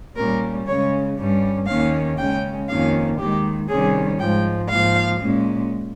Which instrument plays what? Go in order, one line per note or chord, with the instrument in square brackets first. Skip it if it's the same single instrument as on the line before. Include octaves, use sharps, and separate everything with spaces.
[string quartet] A#2 G3 C#4 A#4
C#3 G#3 C#4 C#5
G2 G3 C#4
D#2 D#3 A#3 C#4 F5
C#3 G#3 C#4 G5
F2 D#3 A#3 C#4 F5
D#2 D#3 G#3 G4
C3 D#3 G3 C#4 G#4
G#2 F3 G#3 G5
G#2 F3 A#3 F5
A#2 G#3 C#4